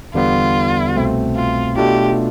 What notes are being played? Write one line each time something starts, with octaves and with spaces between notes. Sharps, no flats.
E2 D3 G3 B3 F4
C2 B2 A3 C4
F4
B2 A3 D4 F4 G4